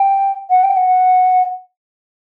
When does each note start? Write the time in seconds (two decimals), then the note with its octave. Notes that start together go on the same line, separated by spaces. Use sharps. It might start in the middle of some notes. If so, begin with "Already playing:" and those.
Already playing: G5
0.50 F#5
0.63 G5
0.76 F#5